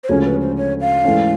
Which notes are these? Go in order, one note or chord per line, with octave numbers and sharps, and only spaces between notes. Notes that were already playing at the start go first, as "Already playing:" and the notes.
C5
D2 C#3 F3 G#3 C#4 C#5
B4
C5
C#5
F5
G#2 E3 A3 C#4